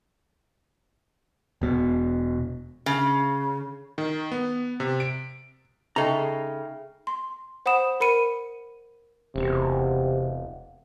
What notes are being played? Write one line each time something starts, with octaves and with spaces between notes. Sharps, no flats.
E1 B2
C#3
D#3
B3
C3
D7
C#3 G#3 D#4 A4 E5 G5 A#5
C6
C5 F#5 B5 D#6 E7
A#4 B5 C#7 D#7
E1 C3